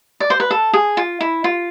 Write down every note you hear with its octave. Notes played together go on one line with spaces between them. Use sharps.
D5
C5
B4
A4
G#4
F4
E4
F4